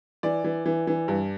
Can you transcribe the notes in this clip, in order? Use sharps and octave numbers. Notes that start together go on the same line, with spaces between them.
E3 D5
E3
E3
E3
G2